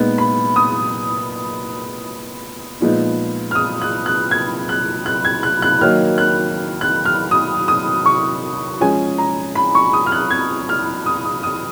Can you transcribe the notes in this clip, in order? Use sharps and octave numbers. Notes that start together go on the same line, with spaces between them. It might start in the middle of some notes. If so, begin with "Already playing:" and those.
Already playing: A#2 G#3 B3 D#4
B5
D#6
A#2 F3 G#3 B3 D#4
F6
D#6
F#6
F#6
G#6
F#6
F#6
G#6
F#6
F#6
D#3 F#3 A#3 D#4 F6
F#6
F#6
F6
D#6
D#6
C#6
F3 G#3 C#4 G#5
A#5
B5
C#6
D#6
F6
F#6
G#6
F6
D#6
D#6
D#6